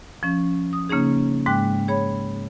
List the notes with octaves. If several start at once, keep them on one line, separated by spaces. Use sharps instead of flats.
F3 C#4
D#6
C#3 A#3 C#4 D#4 G#4
G#2 G#3 G5 D6 F#6
G#4 C#5 B5